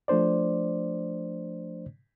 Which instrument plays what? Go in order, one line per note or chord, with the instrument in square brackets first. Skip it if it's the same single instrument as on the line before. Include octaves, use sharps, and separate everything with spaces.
[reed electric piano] F3 A3 D4 C5 D5